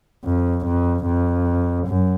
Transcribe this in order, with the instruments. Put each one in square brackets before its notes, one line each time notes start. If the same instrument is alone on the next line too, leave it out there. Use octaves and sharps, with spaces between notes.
[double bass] F2
F2
F2
F#2